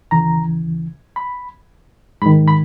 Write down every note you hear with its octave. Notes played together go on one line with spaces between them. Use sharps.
D#2 C#3 E3 A#5
B5
G#2 D#3 B5
B5